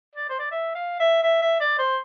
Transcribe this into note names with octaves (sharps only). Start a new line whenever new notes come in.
D5
C5
D5
E5
F5
E5
E5
E5
D5
C5